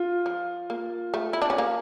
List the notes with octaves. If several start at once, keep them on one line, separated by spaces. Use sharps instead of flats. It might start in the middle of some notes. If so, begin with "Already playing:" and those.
Already playing: F4
F3
A#3
A3
E4
D4
C#4
A#3